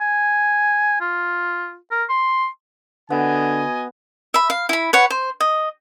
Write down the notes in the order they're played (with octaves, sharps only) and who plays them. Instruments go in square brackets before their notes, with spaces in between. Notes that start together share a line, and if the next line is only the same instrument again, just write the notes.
[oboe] G#5
F4
A#4
C6
[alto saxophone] D3 [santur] B3 [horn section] F#4 D#5 G#5
[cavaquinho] E5 B5
F5
E4 B5
B4 C#5 F#5
C5
D#5